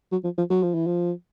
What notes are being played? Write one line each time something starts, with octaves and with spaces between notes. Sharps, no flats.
F#3
F3
F3
F#3
F3
E3
F3